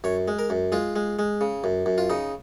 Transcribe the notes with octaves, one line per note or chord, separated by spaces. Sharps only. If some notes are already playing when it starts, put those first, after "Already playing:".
F#2 C#5
G#3
A#4
F#2
G#3 F4
G#3
G#3
C#3
F#2
F#2
F4
C#3 D#4